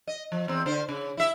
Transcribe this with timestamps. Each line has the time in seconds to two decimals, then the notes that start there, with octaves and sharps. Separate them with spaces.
0.07 D#5
0.32 F3
0.48 E2 C4
0.66 D3 C5
0.89 C#3
1.17 E4 E5